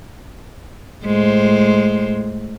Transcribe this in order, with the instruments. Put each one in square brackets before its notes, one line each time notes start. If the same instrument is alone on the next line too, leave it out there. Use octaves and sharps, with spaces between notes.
[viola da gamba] A2 G#3 C5